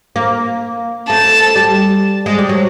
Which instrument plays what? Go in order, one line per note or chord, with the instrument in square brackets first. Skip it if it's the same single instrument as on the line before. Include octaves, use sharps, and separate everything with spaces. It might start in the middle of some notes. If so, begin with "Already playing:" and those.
[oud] A#3
[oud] A3 [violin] A5
[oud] G3
G#3
G3
F#3